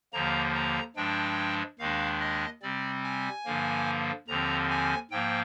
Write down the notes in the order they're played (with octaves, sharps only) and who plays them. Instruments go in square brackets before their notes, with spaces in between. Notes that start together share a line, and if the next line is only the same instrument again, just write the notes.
[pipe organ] D#2 D3 F3 A#3 A#5
A#5
G2 F3 G#3 D4 G5
D#2 D#3 G#3 D4 F5
D#5
C3 G3 C4 D5
G#5
G2 D3 F3 A#3
D#2 D3 F3 C4 A#5
G#5
G#2 F3 A#3 G5